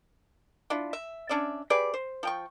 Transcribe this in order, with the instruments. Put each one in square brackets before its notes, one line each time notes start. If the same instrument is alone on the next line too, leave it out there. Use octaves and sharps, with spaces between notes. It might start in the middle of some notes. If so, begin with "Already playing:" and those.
[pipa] D4 E4 F4
E5
C#4 D4 D5 E5
G4 G#4 B4 D5
C5
F3 G5 C#6